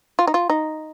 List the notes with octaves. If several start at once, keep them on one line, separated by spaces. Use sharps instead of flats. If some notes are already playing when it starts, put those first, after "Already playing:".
F4
D#4
F4
D#4